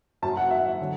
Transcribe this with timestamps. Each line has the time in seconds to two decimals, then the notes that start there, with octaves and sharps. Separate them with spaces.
0.22 F#2 F#3 A5
0.37 F#5
0.51 E5
0.81 D3 F#3